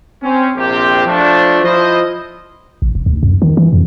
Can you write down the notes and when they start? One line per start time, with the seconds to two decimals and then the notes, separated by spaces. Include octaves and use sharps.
0.23 C4 C#4
0.56 A#1 C3 C4 G4
1.07 F3 A3 D4
1.65 F3 E4 C5 D#5
2.82 A1
2.95 E1
3.06 D2
3.23 F#2
3.42 D#3
3.57 E3
3.73 F2